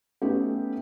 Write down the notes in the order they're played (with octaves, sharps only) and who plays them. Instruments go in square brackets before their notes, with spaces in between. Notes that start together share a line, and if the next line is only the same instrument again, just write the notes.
[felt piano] A3 B3 C#4 D#4 G4